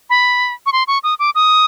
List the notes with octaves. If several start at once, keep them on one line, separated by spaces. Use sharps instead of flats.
B5
C#6
C6
C#6
D#6
D6
D#6